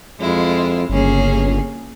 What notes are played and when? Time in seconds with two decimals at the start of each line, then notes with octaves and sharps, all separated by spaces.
0.21 F2 G#3 E4 F4
0.89 G1 C#3 A#3 C#4 G#4